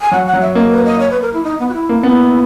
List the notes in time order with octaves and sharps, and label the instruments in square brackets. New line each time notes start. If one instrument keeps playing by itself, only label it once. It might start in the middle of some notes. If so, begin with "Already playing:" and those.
[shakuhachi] G#5
[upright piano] F#3 [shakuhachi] F#5
[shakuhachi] F#5
[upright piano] F#3
[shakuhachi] E5
[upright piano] A#3 [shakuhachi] D#5
[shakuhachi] B4
D#5
C#5
B4
A#4
E4
D#4
B3
F#4
E4
[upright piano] A#3
B3